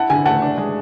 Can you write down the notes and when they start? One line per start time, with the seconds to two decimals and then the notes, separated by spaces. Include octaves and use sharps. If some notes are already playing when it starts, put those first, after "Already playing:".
Already playing: E4 F#5 A5
0.10 D3 G#5
0.25 A3 F#5 A5
0.42 D4
0.58 G#3